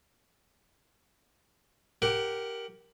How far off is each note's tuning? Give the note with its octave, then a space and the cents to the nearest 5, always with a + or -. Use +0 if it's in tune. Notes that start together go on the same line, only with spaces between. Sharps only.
G4 +0 A#4 +0 F#5 +20